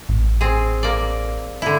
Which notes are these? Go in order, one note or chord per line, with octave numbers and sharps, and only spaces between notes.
A1
C4 G#4
A#3 D5
D3 E4